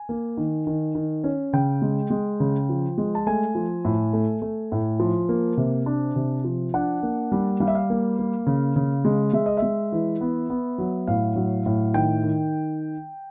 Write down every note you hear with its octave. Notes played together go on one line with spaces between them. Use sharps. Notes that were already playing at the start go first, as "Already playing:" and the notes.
Already playing: G#5
A#3
D#3
D#3
D#3
C#4
C#3 G5
G#3
G#3
C#3
F3
G#3
A5
A3 G#5
F3
A2
A3
A3
A2
F3
A#3
C3
D4
C3
F3
D4 F#5
A#3
G3
G3 F5
E5
F5
A#3
A#3
C#3
C#3
G#3
G#3 E5
D#5
E5
G#3
E3
B3
B3
F#3
A2 F5
F#3
A2
D#3 G5
D#3